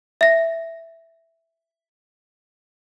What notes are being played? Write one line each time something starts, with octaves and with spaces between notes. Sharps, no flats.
E5 A#6